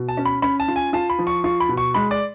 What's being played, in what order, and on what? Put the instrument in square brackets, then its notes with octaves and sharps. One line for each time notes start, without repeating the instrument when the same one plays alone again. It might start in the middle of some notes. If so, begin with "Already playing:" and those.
Already playing: [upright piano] B2
[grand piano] A5
[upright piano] C#4
[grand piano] B5
[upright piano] C#4 [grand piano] B5
[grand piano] A5
[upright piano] F4
[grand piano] G#5
[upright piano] F4 [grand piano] A5
[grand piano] B5
[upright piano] F3
[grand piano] C#6
[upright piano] F4 [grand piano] C#6
[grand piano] B5
[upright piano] B2
[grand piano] C#6
[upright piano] G#3 [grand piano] B5
[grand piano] D5